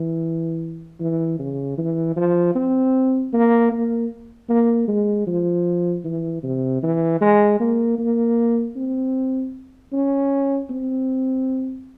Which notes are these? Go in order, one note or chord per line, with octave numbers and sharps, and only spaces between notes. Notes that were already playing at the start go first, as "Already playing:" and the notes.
Already playing: E3
E3
C#3
E3
F3
C4
A#3
A#3
A#3
G#3
F3
E3
C3
E3
G#3
A#3
A#3
C4
C#4
C4